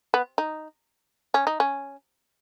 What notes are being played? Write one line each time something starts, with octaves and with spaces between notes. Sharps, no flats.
B3
D#4
C#4
D#4
C#4